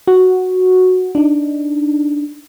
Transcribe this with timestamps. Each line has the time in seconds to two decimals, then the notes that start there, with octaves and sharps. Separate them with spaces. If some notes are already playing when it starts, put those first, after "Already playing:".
0.07 F#4
1.15 D4 D#4